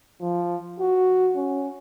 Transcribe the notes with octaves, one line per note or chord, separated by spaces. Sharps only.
F3
F#4
C#4